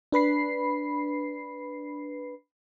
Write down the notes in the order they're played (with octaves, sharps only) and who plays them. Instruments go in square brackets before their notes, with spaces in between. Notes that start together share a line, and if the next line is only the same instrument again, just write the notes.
[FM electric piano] D4 B4 B5 C7